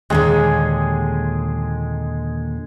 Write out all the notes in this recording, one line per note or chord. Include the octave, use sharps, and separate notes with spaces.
D#2 A#2 D3 G#3 G#4